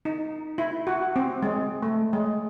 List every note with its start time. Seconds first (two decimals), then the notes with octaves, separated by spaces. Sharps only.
0.05 D#4
0.58 E4
0.87 F#4
1.16 C4
1.43 G#3
1.82 A3
2.13 G#3